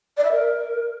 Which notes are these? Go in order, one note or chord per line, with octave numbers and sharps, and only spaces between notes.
D5
E5
A#4